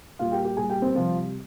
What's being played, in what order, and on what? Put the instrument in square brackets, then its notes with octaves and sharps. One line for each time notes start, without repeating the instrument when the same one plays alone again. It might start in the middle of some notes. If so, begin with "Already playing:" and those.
[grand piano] A#2 G3 F4 F5
G4 G5
G4 G5
A#2 G3 G#4 G#5
G4 G5
C4 C5
C3 F3 G3 F4